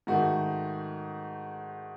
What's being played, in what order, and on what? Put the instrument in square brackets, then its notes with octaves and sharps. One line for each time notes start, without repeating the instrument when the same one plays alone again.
[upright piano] G#2 D#3 A3 F#4